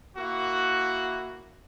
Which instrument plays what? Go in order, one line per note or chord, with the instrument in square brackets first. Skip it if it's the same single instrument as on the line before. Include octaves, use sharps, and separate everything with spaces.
[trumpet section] A#3 E4 F#4